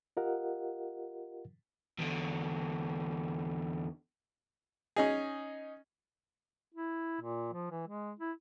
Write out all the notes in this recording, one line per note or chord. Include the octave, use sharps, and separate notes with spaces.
F4 G4 A#4 D#5 F5 F#5
E2 D3
C#4 D#4 G#4
E4
A#2
F3
E3
G#3
E4